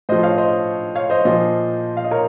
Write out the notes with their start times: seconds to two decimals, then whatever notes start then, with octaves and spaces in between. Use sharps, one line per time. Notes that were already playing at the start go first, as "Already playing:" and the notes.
0.09 A2 F3 C5 D#5
0.23 C#5 F5
0.38 C5 D#5
0.96 C#5 F5
1.10 C5 D#5
1.25 A#2 F3 C5 D#5
1.97 F5
2.04 D#5
2.11 A#4 C#5